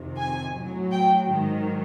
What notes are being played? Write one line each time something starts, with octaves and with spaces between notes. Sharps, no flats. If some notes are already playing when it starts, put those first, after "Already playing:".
Already playing: F2 C3 D#3
G#5
A2 F#3
G5
G#2 D#3 F#3